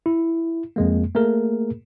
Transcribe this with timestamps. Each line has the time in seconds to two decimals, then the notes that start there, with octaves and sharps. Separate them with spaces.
0.06 E4
0.76 F2 G#3 A#3
1.15 A3 A#3 G#4 A#4